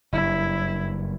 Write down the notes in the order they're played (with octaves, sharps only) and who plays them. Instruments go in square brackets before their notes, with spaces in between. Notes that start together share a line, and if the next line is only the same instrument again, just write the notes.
[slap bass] F#1 G2 [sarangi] E4